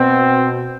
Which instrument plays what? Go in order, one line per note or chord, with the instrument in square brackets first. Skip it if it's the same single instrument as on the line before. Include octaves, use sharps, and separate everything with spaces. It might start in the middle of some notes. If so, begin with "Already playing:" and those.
Already playing: [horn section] B2 C4